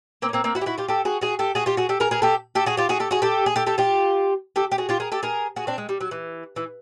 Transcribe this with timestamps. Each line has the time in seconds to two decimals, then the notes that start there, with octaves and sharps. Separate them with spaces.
0.22 A#3 C4
0.29 C#4
0.33 A#3 C4
0.44 A#3 C4
0.55 E4 F#4
0.61 G4
0.66 E4 F#4
0.78 F4 G4
0.88 G4 A4
1.05 F#4 G#4
1.21 F#4 G#4
1.39 G4 A4
1.55 F#4 G#4
1.66 F4 G4
1.77 F#4 G#4
1.89 G4 A4
2.00 G#4 A#4
2.11 G#4 A#4
2.22 G4 A4
2.55 G4 A4
2.66 F#4 G#4
2.77 F4 G4
2.89 F#4 G#4
3.00 G4 A4
3.11 F#4 G#4
3.22 G4 A4
3.46 G#4
3.56 G4 A4
3.66 G4 A4
3.78 F4 G4
4.56 G4 A4
4.72 G4
4.78 F#4 G#4
4.89 F4 G4
5.00 G#4 A#4
5.12 G4 A4
5.23 G#4 A#4
5.56 F#4 G#4
5.67 C4 D4
5.78 G#3
5.89 G3
6.00 F#3
6.11 E3
6.56 E3